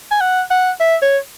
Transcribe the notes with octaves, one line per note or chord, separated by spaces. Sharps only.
G#5
F#5
F#5
E5
C#5